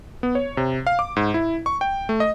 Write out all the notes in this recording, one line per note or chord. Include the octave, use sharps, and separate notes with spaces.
B3
C#5
C3
F5
D6
G#2
E4
C#6
G5
A3
D#5